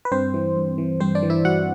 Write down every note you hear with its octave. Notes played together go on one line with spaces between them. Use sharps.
B4
G2 C4 C5
E3
G2
E3
G2 C4 C5
D4 D5
E3
E4 E5
G2 F#4 F#5